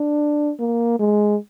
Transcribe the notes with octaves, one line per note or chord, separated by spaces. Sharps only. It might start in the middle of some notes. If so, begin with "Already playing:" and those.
Already playing: D4
A#3
G#3